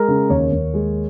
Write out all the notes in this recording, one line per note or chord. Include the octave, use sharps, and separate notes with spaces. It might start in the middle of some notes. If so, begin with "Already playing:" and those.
Already playing: G#3 A#4
C#3
D#2 C#5
D#2
G#3